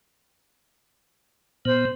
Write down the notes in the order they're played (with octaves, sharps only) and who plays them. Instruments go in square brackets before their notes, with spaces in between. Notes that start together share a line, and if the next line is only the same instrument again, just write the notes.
[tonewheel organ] A#2 B3 [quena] C5